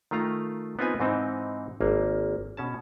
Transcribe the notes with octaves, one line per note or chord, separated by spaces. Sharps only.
D#3 A3 F4 A#5
B3 C4 D#4 F4 B4 G#5
G#2 E3 C4 D#4 A5
G#1 A#3
B2 C#4 A5